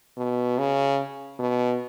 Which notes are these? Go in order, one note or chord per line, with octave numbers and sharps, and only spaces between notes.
B2
C#3
B2